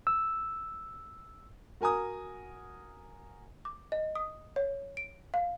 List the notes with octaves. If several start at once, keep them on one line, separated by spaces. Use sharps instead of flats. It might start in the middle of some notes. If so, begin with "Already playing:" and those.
E6
F#4 A#4 G#5 A#5 D#6
D6
D#5
D#6
C#5
D7
F5